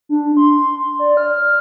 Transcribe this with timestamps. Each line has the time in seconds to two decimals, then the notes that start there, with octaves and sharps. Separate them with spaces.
0.09 D4
0.37 C6
0.99 D5
1.17 F6